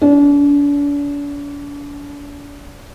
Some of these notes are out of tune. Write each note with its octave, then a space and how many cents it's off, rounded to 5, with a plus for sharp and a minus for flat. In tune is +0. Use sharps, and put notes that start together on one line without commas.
D4 -40